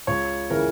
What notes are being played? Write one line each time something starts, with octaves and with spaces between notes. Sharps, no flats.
C#2 C#5
C#3 E3 A#4